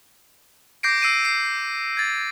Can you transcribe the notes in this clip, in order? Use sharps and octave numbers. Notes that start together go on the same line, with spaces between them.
D6 G6 A#6 C7 D7
E6 C7 D7 D#7
C7
G#6 A6